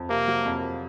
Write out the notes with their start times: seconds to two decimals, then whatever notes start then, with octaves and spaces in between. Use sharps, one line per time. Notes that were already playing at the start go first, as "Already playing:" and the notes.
Already playing: F2
0.09 C3 A#3
0.28 F#3
0.45 F2